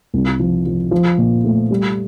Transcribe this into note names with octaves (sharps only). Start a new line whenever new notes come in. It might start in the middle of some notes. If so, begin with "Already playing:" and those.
C2
F3
F3
F3
A#2
A3
G3